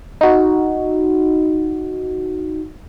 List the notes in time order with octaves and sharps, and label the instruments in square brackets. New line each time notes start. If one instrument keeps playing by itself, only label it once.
[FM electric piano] D#4 F#4